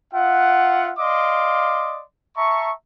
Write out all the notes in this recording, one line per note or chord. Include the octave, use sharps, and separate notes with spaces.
F4 E5 F#5
D5 D#5 F5 C6 D6
E5 A5 A#5 C#6